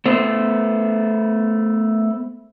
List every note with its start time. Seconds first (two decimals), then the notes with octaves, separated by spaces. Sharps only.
0.05 A3 B3 C5